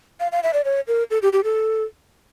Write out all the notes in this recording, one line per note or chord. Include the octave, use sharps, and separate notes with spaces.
F5
F5
E5
D5
C#5
A#4
A4
G4
G4
A4